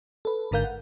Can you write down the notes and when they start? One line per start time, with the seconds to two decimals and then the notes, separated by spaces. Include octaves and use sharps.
0.25 A4 B4
0.51 G#1 G#2 D3 A#4 F5 G6
0.64 F#5